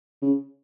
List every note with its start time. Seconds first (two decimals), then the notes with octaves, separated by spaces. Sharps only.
0.22 C#3